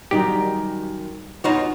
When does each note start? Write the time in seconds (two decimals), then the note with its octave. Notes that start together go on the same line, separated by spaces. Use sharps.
0.11 F#2 D#3 F#3 G3 D#4 G4
1.44 E2 D#4 F4 F#4 C#5 D#5